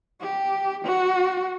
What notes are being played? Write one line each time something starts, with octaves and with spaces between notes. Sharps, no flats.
G4
F#4